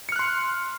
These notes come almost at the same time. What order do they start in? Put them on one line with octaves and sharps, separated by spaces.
C#7 F6 F#6 C6